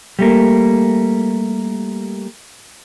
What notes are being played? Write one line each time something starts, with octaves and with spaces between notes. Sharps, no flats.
G3 A3 A#3